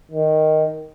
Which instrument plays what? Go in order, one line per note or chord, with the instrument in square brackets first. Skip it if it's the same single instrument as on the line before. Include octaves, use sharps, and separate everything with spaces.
[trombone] D#3